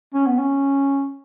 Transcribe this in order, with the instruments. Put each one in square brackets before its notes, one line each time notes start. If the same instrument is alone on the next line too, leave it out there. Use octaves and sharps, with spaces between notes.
[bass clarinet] C#4
B3
C#4